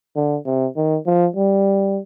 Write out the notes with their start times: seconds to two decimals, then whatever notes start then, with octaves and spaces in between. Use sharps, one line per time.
0.16 D3
0.46 C3
0.77 D#3
1.06 F3
1.36 G3